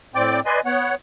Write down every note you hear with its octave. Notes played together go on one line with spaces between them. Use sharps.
A2 C4 D5 G5 D6
B4 D5 D#5 G#5 C6
B3 C#5 F#5